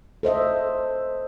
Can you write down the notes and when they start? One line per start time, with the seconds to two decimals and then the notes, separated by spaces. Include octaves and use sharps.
0.23 A4 C5 D#5 E5